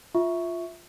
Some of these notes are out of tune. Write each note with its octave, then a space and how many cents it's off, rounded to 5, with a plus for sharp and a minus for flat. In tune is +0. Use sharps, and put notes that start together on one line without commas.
F4 +0 E5 -5 C#6 +0